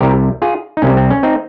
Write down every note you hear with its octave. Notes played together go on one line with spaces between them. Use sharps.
C2 C3 G3 G4 A#4
F4 G#4
D#4
C2 C3 G3 C#4
C4
C#4
C4 D#4